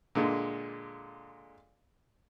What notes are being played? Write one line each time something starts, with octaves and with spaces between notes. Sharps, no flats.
A#2 D3 G#3